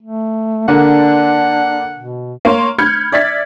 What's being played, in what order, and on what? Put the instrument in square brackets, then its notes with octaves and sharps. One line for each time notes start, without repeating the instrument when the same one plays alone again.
[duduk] A3
[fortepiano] D3 A#3 [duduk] D4 [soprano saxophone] F#5
[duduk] B2
[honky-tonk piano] A#3 C#5 C6
B5 F6 G6 G#6 C#7
D5 E5 G#6 A6 B6